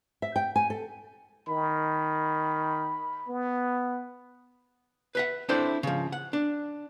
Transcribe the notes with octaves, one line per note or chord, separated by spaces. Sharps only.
E5
G5
G#5
A4
D#3 B5
B3
B4 E5 F#5
C4 D4 E4 A4 C5 D5
C#3 F3
F#5
D4